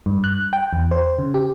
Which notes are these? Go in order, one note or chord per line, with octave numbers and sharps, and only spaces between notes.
G2
F#6
G5
E2
C5
C#3
G4